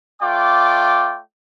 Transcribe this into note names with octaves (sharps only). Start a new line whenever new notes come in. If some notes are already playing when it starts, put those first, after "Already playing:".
A3 F4 D5 G5 D6